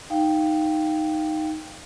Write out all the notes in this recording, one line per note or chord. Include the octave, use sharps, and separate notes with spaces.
D#4 F5 G5